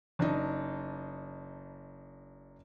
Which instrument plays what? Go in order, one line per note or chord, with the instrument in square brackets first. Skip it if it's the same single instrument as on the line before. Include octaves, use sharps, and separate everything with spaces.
[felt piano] F#1 D4 D#4